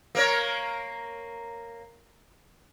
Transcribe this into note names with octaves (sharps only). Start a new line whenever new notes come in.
A#3 A#4 C#5